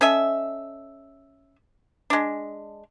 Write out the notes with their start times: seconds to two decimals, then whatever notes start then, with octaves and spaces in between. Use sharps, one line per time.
0.01 C#4 A4 D#5 E5
2.10 G#3 D4